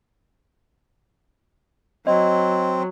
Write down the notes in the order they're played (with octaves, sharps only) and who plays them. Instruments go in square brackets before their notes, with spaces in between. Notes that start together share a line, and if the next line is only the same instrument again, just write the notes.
[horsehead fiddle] F#3 [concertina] C4 [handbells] D#5